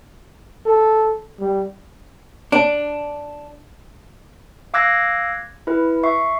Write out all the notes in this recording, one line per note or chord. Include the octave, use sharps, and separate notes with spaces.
A4
G3
D4
F5 D6 E6 F#6 G#6 A#6
E4 B4
E5 C#6 C7